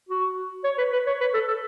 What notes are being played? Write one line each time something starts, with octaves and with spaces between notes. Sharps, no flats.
F#4
C#5
B4
B4
C#5
B4
A4
A4